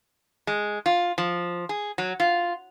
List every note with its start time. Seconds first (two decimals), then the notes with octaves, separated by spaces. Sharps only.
0.47 G#3
0.86 F4
1.18 F3
1.69 G#4
1.98 F#3
2.20 F4